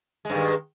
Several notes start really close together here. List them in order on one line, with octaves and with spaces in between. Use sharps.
G#3 G2 D#3